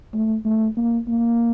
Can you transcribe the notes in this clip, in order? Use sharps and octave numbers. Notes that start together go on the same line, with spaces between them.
A3
A3
A#3
A#3